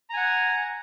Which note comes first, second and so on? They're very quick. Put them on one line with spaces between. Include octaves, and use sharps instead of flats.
A#5 G#5 F#5